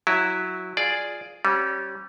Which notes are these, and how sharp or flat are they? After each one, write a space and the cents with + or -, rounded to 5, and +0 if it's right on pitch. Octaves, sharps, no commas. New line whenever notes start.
F#3 +0 E4 -10
F4 +0 G#4 +0 D5 +0
G3 -25 C#4 -35